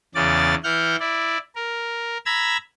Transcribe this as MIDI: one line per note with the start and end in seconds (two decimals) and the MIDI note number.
0.15 0.55 40
0.15 0.55 49
0.15 0.55 61
0.15 0.55 74
0.15 0.55 93
0.64 0.96 52
0.64 0.96 78
0.64 0.96 89
0.64 0.96 91
1.00 1.38 64
1.00 1.38 74
1.55 2.17 70
2.26 2.57 82
2.26 2.57 83
2.26 2.57 88
2.26 2.57 92